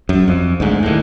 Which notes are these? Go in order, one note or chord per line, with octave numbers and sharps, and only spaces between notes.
F#2
F2
D2 G#2
D#2 A2